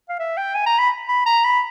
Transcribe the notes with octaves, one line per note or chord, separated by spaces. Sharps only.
F5
E5
G5
G#5
A#5
B5
B5
A#5
B5